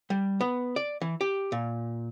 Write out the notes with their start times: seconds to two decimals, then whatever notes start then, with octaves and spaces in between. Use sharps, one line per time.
0.10 G3
0.41 B3
0.76 D5
1.02 E3
1.21 G4
1.52 A#2